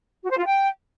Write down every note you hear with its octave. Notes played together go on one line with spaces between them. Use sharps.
F#4
C5
F4
G5